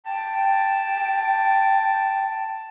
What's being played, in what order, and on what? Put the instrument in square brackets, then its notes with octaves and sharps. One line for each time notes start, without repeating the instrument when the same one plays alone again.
[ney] G5 [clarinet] A5